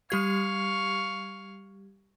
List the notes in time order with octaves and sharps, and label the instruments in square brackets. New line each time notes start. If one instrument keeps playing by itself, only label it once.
[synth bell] G3 G4 G#6 [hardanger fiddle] F5 C#6